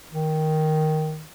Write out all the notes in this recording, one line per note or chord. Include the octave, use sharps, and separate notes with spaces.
D#3